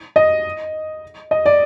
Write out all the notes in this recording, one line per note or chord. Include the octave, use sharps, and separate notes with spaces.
D#5
D#5
D5